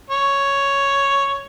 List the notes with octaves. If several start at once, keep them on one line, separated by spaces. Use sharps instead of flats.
C#5